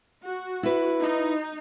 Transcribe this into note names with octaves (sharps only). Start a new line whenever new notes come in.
F#4
E4 B4
D#4